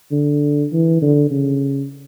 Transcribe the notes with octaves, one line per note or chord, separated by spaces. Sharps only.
D3
E3
D3
C#3